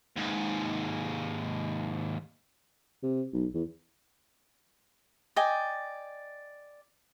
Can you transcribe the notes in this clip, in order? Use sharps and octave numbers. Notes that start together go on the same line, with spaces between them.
D#2 G#2
C3
B1
E2
D5 D#5 G5 G#5